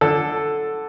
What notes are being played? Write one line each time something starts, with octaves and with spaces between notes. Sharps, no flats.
D3 A4